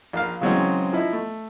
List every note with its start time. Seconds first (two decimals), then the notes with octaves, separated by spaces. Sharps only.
0.13 A#1 A#4 F5
0.41 C#3 E3 F#3 G#3 C4 C#4
0.93 F3 D#4 E4
1.13 A3